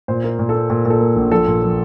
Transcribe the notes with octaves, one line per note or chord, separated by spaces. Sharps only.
A#2 C5
A#3
A#2
A4
A#3
A#2
A#2 A4
A#3
A#1
F3 A4
A#2
F3